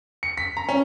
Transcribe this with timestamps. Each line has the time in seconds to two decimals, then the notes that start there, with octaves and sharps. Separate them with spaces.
0.23 C#7
0.38 B6
0.57 A#5
0.69 C#4